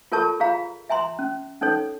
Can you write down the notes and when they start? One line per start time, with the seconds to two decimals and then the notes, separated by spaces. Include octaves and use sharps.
0.12 F4 A4 A#4 C#5 A5 C#6
0.40 F4 G#4 C#5 F5 A#5
0.90 E5 G#5 A#5 C6
1.19 C#4
1.61 C#4 D#4 A4 C#5